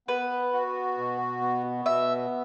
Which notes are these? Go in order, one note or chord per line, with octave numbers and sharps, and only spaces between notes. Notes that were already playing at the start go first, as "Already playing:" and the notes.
B3 B4
F#4
B2
B3
B2 E5